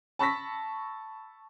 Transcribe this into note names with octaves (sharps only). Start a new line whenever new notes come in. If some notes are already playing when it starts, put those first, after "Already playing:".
A5 B5 C#6 E6 A#6 B6